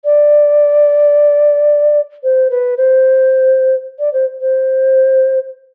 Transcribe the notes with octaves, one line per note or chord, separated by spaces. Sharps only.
D5
C5
B4
C5
D5
C5
C5